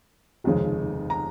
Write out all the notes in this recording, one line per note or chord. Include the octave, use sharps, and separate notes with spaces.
F1 D#2 C#3 F3 G#3
A#5